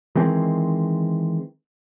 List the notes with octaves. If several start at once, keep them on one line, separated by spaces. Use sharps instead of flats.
D#3 E3 G#3 C4